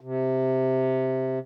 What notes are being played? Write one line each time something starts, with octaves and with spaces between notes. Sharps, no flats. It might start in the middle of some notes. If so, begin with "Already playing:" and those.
C3